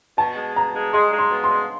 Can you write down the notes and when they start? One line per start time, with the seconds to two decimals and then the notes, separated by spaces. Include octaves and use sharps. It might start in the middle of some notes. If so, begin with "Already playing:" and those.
0.18 B2 A5
0.36 G#3
0.56 B2 A#5
0.74 G#3
0.93 G#3 C6
1.12 G#3
1.19 C6
1.31 B2
1.44 C6
1.50 G#3